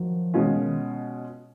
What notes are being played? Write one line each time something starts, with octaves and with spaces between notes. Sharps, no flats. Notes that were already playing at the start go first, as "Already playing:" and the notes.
Already playing: D#3 F3 F#3
B2 E3 G#3 C#4 F4
D#3
D#3